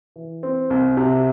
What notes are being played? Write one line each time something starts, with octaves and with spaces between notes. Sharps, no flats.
E3
C4
C2
C3